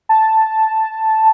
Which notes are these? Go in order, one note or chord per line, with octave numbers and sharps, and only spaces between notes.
A5